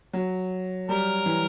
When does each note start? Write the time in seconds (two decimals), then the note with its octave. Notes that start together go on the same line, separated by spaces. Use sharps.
0.13 F#3
0.88 G3 A#4
1.26 E3